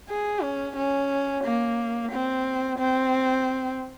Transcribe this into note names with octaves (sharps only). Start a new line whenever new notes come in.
G#4
C#4
C#4
A#3
C4
C4